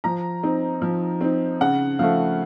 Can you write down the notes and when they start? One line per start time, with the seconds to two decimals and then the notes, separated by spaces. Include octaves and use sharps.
0.04 F3 A#5
0.43 C4 D#4
0.82 F3
1.21 C4 D#4
1.61 C#3 F#5
1.99 F3 A3 F5